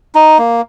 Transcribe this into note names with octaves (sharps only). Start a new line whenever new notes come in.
D#4
A#3